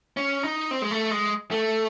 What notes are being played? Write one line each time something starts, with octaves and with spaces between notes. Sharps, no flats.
C#4
D#4
C4
G#3
A3
G#3
A3